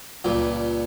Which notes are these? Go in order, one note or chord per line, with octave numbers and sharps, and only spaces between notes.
C#2 G2 A#2